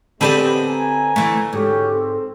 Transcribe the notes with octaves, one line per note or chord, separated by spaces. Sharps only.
D3 G#3 B3 C4 G4 B4 D5 A5
G#5 A#5
E3 A3
G#2 C#4 F#4 G4 A4
C4